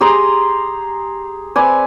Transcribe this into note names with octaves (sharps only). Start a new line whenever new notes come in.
G4 G#4 A#5 C6
C4 B4 D5 G#5